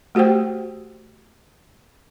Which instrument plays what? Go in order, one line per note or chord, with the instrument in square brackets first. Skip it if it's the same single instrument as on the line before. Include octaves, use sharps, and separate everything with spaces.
[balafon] A3 F#4 G4 C5 G5